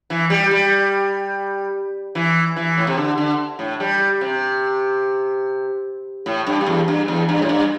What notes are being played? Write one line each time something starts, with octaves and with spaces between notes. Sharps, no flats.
E3
G3
G3
E3
E3
A2
C3
D3
D3
A2
G3
C3
A2
G2
G2
E2
G2
E2
G2
A2
G2